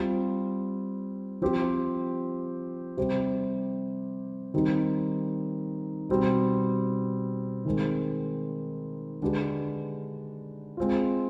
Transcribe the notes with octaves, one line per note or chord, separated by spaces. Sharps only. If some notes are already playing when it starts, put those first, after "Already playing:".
Already playing: G3 C4 F4
F3 C4 G4 C5
C3 G3 C4 G4 C5
D#3 G3 C4 D#4
B2 G3 C4
D#3 G#3 C4
D3 G#3 D4 G4 B4
G#3 C4 F4